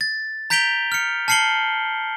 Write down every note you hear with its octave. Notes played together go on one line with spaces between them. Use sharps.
A6
A#5 G6 B6 D7 F7 G7
F6 C#7
A5 F6 C7 C#7 F#7 G7